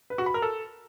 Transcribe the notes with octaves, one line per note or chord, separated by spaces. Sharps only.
B4
F#4
B5
A#4
A4